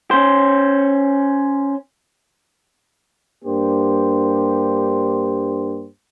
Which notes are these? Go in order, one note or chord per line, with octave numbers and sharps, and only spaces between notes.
C#4 C5
G2 A#3 D4 G4 C5